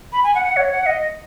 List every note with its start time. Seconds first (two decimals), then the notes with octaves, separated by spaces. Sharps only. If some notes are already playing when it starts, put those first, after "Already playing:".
0.13 B5
0.23 G#5
0.35 F#5
0.45 F#5
0.57 C#5
0.72 F#5
0.86 D#5